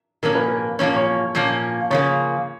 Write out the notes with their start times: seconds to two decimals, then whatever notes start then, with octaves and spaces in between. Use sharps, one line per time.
0.23 A#2 F3 A#3 C#4 A#4
0.35 B4
0.48 A#4
0.79 A#2 F3 A#3 C#4 C#5
0.96 C#5
1.35 A#2 F3 A#3 C#4
1.90 C#3 F3 A#3 C#5